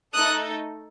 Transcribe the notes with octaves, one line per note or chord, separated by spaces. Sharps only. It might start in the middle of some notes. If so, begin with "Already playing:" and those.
A3 D#4 A4 D#6 F#6